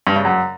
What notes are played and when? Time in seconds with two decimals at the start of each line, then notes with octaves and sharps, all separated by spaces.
0.07 G2
0.16 C#3
0.25 F#2